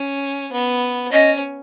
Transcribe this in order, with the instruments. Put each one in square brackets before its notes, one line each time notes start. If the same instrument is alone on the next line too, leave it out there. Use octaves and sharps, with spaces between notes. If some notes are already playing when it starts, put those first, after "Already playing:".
Already playing: [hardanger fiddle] C#4
B3
[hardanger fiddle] C#4 [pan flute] D#5